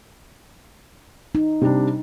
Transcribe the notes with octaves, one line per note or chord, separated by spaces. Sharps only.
D#4
C3 G3 D4